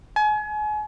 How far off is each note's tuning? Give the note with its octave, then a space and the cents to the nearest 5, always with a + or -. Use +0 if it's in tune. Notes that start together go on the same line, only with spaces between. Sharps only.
G#5 +35